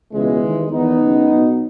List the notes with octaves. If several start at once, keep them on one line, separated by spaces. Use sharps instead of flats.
C#2 B2 E3 G#3
D#2 D#3
E2 D#3 B3 D#4
F#1 F#2 C#3
B1 B2